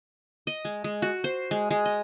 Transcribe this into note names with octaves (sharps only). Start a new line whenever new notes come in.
D#5
G#3
G#3
F#4
C5
G#3
G#3
D#5